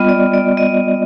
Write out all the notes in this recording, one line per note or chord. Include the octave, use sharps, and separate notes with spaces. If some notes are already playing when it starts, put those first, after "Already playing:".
Already playing: G3 B3 F4 D#5
D5
D5
D#5